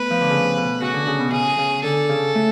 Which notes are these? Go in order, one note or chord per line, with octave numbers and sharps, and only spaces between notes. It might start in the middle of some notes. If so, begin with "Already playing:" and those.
Already playing: A3 B3 B4
F3
D3
C#3
B2
C#3 F#4
D3
C#3
B2
C#3 G#4
C#3
D3 A4
C#3
A3